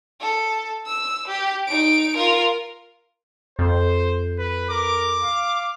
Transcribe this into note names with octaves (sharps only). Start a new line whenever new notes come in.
A4
E6
G4
D#4 D7
F4 A#4
F2 C5
B4
A#4 D6
F5